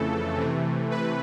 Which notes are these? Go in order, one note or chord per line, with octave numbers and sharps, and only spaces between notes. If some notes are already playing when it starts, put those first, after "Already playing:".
Already playing: F2 C#3 E3 A3 A4
C3 E3 A3
B4